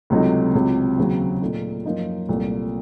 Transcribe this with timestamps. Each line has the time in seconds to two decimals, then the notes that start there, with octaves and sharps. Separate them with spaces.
0.10 C#2 C3 F#3 A3 D#4
0.54 C#2 C3 F#3
0.98 D#2 C#3 F#3 C4
1.41 A#2 A3 D#4
1.85 F#2 F3 A#3 D#4
2.29 C2 A#2 A3